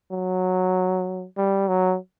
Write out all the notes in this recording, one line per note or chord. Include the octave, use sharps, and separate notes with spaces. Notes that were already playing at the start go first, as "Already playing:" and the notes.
F#3
G3
F#3